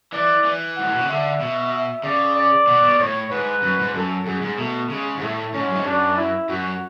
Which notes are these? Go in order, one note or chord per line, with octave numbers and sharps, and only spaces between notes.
E3 D5
E3
G#2 F#5
A2
B2
C#3
D3 E5
B2
E5
C#3 D5
D5
B2
B2
A2 C#5
G#2 B4
F#2
G#2
F#2 A4
F#2 G#4
G#2
B2 A3
C#3 G#3
G#2
A2 A3
A2 C#4
G#2
F#2
G#2
F#2 D4
E4
F#2 F#4